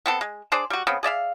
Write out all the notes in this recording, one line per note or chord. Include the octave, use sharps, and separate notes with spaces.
B3 C4 A4
G#3
D4 G#4 C5 D5
G3 F#4
C#3 B3 C4
G#4 D5 E5 F5